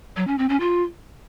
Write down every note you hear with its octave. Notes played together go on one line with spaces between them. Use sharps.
F#3
C#4
C4
C#4
F4